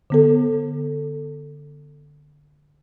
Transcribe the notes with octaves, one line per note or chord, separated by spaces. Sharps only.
D3 B3 A4